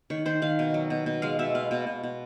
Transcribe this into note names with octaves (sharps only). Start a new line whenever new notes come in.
D#3 C#5
D#3 C5
D#3 F5
B2
F#3
B2
B2
G#3 F5
B2 E5
B3 F5
B2
B2
B2